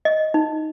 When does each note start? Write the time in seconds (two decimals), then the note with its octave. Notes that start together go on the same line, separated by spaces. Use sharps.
0.05 D#5
0.34 D#4